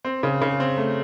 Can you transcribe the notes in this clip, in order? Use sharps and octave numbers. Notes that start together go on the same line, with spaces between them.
C4
C#3
C#3
C4
A3